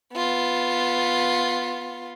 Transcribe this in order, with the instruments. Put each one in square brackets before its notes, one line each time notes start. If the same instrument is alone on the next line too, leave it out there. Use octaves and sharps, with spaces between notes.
[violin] B3 F4